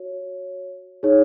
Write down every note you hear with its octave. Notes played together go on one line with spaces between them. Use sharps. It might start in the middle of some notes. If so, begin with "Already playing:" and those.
Already playing: F#4 C#5
D#4 G#4 C#5